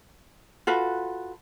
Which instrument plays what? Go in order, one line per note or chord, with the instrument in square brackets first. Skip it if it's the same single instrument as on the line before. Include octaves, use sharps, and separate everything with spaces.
[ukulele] F4 F#4 A4 B4